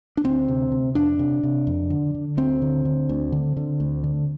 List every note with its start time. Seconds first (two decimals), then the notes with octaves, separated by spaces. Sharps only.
0.17 D4
0.24 D2 C4
0.48 C3
0.72 C3
0.95 F2 D4
1.19 C3
1.43 C3
1.67 F2
1.90 D3
2.15 D3
2.37 D2 C4
2.62 D3
2.85 D3
3.09 D2
3.32 D3
3.57 D3
3.80 D2
4.04 D3